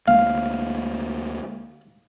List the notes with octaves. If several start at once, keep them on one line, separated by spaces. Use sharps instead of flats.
D2 G#3 A#3 F5